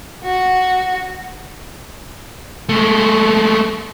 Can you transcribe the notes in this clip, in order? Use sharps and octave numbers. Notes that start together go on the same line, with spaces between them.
F#4
G#3 A3